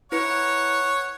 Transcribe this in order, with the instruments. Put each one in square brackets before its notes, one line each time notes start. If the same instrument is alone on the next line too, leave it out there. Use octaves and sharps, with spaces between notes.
[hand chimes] E4 B4 C#7 [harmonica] C#5 F#5